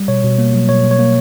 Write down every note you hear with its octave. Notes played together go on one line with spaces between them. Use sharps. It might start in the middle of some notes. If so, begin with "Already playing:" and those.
Already playing: G3
B2 C#5
B2
A#3
F#3
B2 C#5
B2
C#5
A#3